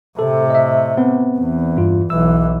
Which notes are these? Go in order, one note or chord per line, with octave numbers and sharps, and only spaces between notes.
A2 C3 A4
D#5 E5
B3 C4 B4
E2
G2 F4
B1 E3 E6